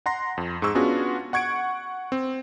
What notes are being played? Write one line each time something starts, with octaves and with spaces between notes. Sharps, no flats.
F#5 A#5 C6 A#6
F2
G#2 G#4 C#6 E6
B3 C#4 D4 F4 F#4 G#4
F#5 C#6 G#6 C#7 D7
C4